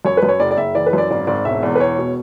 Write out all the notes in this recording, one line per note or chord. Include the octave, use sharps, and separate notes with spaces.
F#2 C#5
B4
F#2
C#5
F#1 D5
D5
F#1 E5
E3 D5
B4
F#2 D5
G#1 D5
G#1 D5
E1 E5
E2 D5
B4
E1 C#5
B2